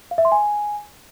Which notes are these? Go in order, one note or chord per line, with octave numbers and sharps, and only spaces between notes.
F5
E5
C6
G#5